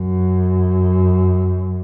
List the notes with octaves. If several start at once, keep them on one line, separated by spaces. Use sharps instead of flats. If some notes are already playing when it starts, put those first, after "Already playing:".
Already playing: F#2